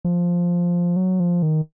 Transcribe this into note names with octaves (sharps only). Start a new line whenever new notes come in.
F3
F#3
F3
D#3